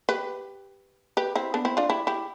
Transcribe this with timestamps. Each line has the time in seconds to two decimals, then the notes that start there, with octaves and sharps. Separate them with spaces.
0.09 G4 B4
1.17 G4 B4
1.35 C4 E4
1.54 B3 D4
1.65 C4 E4
1.77 D4 F4
1.90 E4 G4
2.07 E4 G4